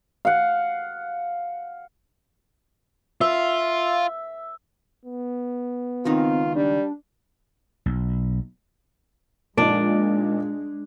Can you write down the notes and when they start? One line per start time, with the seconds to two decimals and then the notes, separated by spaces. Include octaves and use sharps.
0.25 F5 F#5
3.21 F4 E5
5.05 B3
6.05 C#2 D#3 C4 D#4 F4
6.55 G3 D4
7.86 B1
9.57 A#2 F3 G#3 D4 D#4 D5